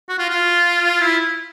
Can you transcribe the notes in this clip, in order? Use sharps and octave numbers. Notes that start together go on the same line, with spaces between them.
F#4
F4
F4
E4